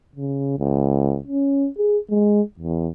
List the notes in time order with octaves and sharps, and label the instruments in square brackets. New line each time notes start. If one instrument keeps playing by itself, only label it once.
[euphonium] C#3
C#2
C#4
G#4
G#3
E2